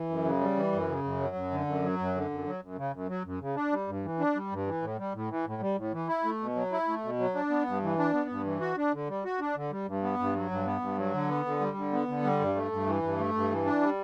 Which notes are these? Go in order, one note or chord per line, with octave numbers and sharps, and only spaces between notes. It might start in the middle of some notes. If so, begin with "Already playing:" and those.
Already playing: E3
F#2
C#3
G3
E3
F#2
C#3
F#2
F#3
F#2
D3
F#2
F#3
F#2
D3
F#2
F#3
F#2
C#3
F#2
F#3
F#2
C#3
D4
G3
G2
E3
D4
G3
G2
E3
A2
G3
A2
E3
A2
G3
A2
E3
E4
A3
B2
F#3
E4
A3
B2
F#3
D4
B3
G2
E3
D4
B3
G2
E3
F#4
D4
D3
G3
F#4
D4
D3
G3
G2
B3
G2
F#3
G2
B3
G2
F#3
D3
B3
D3
G3
D3
B3
D3
G3
G2
A3
G2
E3
G2
A3
G2
E3
D4
G3